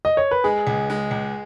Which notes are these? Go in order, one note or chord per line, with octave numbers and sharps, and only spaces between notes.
D#5
C#5
B4
G#3 G#4
C#2
G#3
C#2